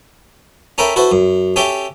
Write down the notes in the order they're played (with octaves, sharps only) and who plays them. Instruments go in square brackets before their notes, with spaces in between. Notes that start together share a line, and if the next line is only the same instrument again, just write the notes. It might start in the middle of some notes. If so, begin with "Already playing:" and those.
[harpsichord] C#4 A4 A#4 E5 G5 B5
E4 F#4 A4 B4 C5
F#2
C#4 G4 A4 E5 G5